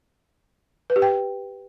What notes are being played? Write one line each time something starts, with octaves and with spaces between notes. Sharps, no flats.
B4
G4
G5